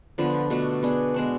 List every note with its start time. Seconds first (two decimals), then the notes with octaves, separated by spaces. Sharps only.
0.18 D3 F3 B3 D4
0.50 B2 A3 D4 F#4
0.83 B3 D4 G#4
1.14 B2 G#3 D4 F#4